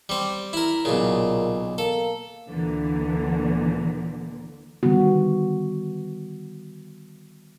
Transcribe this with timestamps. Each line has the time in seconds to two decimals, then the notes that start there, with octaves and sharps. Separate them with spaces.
0.09 G3 C4
0.53 E4 A#4
0.85 B1 A#2 C#3
1.78 A#3 A4
2.48 D2 A#2 D3 E3
4.83 D3 D#3 G3 B3 F#4